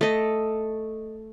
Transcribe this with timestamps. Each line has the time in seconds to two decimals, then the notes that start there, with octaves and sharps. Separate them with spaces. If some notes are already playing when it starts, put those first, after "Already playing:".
0.01 A3 D#5